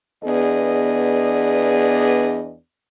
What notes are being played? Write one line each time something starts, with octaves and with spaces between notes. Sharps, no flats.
E2 B3 D4 G#4 D5 D#5